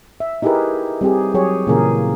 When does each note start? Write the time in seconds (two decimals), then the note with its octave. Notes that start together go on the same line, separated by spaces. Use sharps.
0.20 E5
0.42 D#4 E4 G4 G#4 A#4 B4
1.01 G3 C4 G4 G#4
1.34 F#3 G4 G#4 C#5
1.67 A#2 C#3 E3 A#3 G#4 A#4